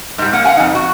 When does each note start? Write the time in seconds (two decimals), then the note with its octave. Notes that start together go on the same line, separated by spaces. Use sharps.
0.18 G#2 G3
0.33 A#3 F#5
0.45 F5 F#5 G#5
0.57 F2 D#4
0.75 F#4